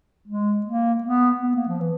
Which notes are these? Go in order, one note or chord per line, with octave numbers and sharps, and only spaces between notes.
G#3
A#3
B3
B3
A#3
F3
E3